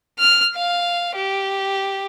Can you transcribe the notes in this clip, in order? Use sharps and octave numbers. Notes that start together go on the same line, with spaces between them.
F6
F5
G4